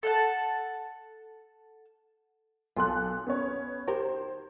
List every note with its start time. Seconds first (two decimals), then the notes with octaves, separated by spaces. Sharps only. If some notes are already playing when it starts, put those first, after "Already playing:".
0.03 A4 F#5 A5
2.76 B1 F4 A4 F#6
3.27 B3 C#4 C#5
3.88 D#3 G4 A#4 C5